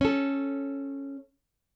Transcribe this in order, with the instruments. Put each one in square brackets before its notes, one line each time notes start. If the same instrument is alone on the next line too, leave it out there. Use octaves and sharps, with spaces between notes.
[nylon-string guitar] C#4 A4